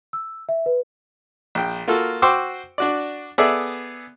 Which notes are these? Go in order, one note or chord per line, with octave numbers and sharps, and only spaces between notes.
E6
E5
B4
A#1 G5
A#3 F4 F#4 A4
F#4 C5 G5 C#6 D6 E6
D4 F#4 D5
B3 G#4 A4 D5 E5